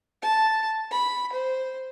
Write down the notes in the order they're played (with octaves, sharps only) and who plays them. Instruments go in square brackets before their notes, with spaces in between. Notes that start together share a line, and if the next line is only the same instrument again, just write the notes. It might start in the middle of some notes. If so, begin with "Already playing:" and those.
[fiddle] A5
B5
C5